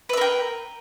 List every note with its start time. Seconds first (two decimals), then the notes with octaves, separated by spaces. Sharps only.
0.09 B4
0.13 E5
0.17 A#4
0.21 G5